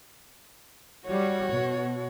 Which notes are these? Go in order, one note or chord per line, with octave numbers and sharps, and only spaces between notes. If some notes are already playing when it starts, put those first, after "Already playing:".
G3 F#4 C#5
B2